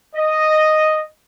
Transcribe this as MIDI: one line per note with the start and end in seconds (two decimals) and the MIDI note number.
0.16 1.02 75